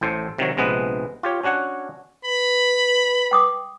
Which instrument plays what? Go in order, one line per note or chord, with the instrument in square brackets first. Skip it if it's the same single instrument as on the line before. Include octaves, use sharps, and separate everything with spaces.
[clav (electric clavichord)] A1 A2 C5 A5
C3 D#3 F#3 C#5
A#1 C3 G#3 B3 B4
F4 G4 C#5
C#4 D4 F#4 C#5 F#5
[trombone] B4 [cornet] B5
[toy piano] G5 D6 D#6